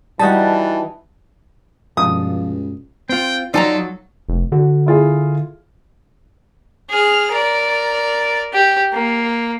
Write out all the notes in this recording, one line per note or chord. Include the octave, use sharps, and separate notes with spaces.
E3 G3 D#4 F#4 A5
C#2 G2 B2 F3 D#6
C4 F4 G5
F#3 D#4 F4 A4 D5 G#5 A#5
F1
D3 F#4
E4 F4 G#4
G#4 F6
A#4 D5
G4
A#3